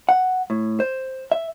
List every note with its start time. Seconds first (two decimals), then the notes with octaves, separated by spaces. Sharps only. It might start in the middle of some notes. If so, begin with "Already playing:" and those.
0.09 F#5
0.50 A2
0.80 C5
1.32 E5